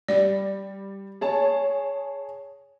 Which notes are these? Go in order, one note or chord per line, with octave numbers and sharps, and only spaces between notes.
G3 D5
G#4 C#5 A5